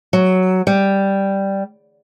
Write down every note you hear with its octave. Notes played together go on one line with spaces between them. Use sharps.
F#3
G3